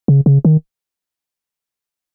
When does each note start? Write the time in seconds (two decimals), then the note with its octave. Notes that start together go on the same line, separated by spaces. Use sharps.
0.08 C#3
0.26 C#3
0.45 D#3